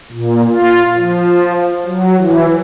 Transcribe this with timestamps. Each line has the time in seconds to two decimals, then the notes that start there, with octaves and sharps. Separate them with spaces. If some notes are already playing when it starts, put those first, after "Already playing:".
0.12 A#2
0.48 F4
0.97 F3
1.86 F#3
2.16 E3